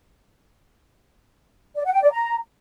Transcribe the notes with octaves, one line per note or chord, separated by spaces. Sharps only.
D5
F#5
G5
D5
A#5